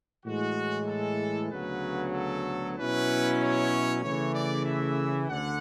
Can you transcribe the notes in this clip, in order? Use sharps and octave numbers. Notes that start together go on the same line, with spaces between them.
A2 E3 G#3 F#4
A4
D2 C#3 F#3 B3 B4
A4
B2 F#3 C#4 E4 B4
C#5
C#3 E3 A3 C#5
D5
E5
D2 D3 F#5